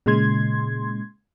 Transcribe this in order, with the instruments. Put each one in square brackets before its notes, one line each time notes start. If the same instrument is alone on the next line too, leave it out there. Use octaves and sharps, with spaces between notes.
[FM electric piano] A#2 C#3 G#3 C6 G#6